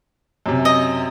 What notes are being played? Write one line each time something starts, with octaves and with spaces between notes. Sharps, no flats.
F#2 C3
D#5